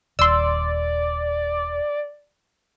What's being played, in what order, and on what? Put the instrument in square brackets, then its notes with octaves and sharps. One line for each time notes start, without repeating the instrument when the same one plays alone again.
[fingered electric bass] D#1 [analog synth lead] D5 [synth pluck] C6 E6